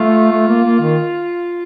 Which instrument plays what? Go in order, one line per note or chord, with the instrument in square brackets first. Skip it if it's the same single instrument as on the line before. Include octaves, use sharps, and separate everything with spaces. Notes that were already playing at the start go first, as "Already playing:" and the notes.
Already playing: [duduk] A3 [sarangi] F4
[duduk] A3
A#3
A#3
D#3